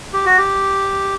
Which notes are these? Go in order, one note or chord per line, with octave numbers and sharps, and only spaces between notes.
G4
F#4
G4